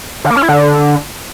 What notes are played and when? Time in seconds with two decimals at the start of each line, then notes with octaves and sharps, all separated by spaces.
0.24 D3
0.31 A#3
0.37 C#4
0.43 E4
0.49 D3